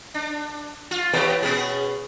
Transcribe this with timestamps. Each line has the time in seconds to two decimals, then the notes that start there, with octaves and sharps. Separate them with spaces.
0.14 D4
0.91 F4
1.13 E3 B3 G4 B4 C#5
1.42 B2 B3 C#4 G#4